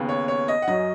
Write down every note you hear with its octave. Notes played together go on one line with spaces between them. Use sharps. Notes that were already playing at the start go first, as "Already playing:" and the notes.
Already playing: D#2 C#3 B3
C#5
C#5
D#5
F#5
F#2 F#3 C#4 D#5